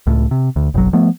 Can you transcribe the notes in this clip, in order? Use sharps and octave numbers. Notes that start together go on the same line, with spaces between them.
C#2 A2
C3
D2
F#1 B1 F#3
F3 A3 B3